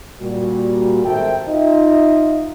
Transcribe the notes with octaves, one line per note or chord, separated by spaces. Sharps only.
A#2 G3 F#4
G#1 A4 A#4 C5 E5 G5
D#4 F4 D#5 E5